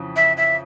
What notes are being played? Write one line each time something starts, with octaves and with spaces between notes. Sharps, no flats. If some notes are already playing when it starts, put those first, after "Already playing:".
Already playing: F2 C#3 E3
E5
E5